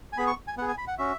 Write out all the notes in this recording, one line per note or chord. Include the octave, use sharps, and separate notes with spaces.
G#5
B3 G#4 B5
C#6
G#5
B3 G#4 F#5
G#5
B5
F#5
C#4 F#4 E5